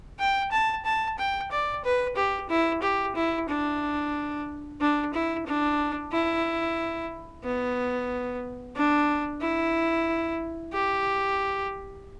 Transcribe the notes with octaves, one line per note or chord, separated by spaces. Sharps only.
G5
A5
A5
G5
D5
B4
G4
E4
G4
E4
D4
D4
E4
D4
E4
B3
D4
E4
G4